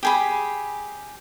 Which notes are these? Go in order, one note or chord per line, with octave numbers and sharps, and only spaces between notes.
G4 G#4 B5